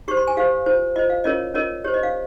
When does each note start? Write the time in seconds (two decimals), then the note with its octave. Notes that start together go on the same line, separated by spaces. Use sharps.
0.08 G4 C5 C#6
0.17 C6
0.27 G#5
0.37 G4 C5 F5
0.66 F4 C5
0.96 F4 C5 D#5
1.10 F5
1.24 C#4 F4 A#4 C#5 D#5
1.54 C#4 F4 A#4 C#5 D#5
1.84 G4 C5 C#5
1.94 D#5
2.03 F5